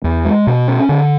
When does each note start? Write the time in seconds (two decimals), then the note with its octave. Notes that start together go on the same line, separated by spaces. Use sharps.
0.04 E2
0.25 G#3
0.47 B2
0.68 C#4
0.89 D3